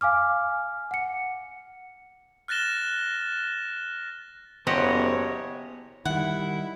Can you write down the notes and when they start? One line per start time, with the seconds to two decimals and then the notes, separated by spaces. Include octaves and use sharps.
0.01 F5 G#5 D6 F6
0.91 F#5 C#7
2.48 F6 F#6 A6 A#6 E7 G7
4.67 F#1 B3 G4 C5 C#5 D#5 F#5
6.05 D#3 G3 E4 F#5